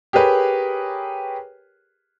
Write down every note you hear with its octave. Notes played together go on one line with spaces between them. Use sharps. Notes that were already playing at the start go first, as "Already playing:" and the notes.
G4 G#4 A#4 B4 C#5